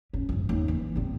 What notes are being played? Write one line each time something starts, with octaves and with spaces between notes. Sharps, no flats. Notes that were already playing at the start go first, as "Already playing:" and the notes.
C#4
F#2 F3
D#2
E3
A#2 C4